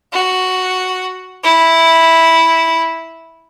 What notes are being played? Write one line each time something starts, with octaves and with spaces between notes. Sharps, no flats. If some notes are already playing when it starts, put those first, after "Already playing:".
F#4
E4